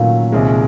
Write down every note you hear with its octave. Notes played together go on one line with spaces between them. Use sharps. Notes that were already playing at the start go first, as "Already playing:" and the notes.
Already playing: A#2 D#3 F#3 A3 C#4
C2 C3 D#3 G#3